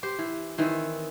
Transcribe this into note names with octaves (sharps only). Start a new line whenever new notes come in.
G4 C5
E3
D#3 E3 C4